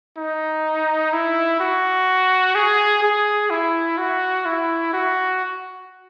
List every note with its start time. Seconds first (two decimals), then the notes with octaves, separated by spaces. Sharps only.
0.17 D#4
1.13 E4
1.60 F#4
2.55 G#4
3.02 G#4
3.50 E4
3.98 F#4
4.45 E4
4.93 F#4